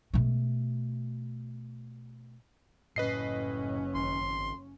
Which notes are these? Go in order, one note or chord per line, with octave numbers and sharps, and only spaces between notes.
B2 A3
F#1 A2 C#4 B4 D#5 C7
G#1 C6